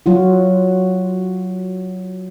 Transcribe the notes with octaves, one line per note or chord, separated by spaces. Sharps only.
F#3 F4 F#4